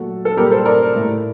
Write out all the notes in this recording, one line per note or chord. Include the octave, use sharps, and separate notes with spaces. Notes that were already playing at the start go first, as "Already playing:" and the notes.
Already playing: A#2 F#3 A3 F#4 A4
A4
A#2 G3 G4 A#4
A4 C5
A#4 D5
A2 A3